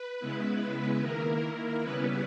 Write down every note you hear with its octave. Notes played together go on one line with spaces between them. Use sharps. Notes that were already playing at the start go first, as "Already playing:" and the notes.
Already playing: B4
C#3 G#3 B3 E4
D#3 A#3 E4 A#4
C#3 G3 B3 C#4 E4 B4